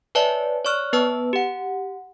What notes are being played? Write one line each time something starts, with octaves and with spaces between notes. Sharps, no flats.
B4 C#5 D5 E5 G#5 A5
C#5 D5 C#6 F6 F#6
B3 B4 A5 E6
G4 F#5